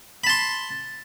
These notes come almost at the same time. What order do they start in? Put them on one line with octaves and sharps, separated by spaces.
B5 A5 C6